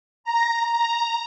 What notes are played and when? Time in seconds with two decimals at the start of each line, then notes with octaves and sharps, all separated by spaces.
0.24 A#5
0.72 A#5